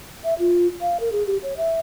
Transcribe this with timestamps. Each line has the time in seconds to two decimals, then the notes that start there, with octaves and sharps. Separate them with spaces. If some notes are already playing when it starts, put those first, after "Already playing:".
0.24 E5
0.39 F4
0.81 F5
1.00 A#4
1.12 G#4
1.27 G4
1.43 C#5
1.57 E5